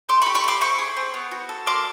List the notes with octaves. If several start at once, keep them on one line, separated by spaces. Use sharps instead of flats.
A3 C6 D6
B5 C#6
G4
B5 C#6
A3 C6 D6
C4 B5 C#6
G#4
C4
B3
F#4
A4
A#3 C6 D6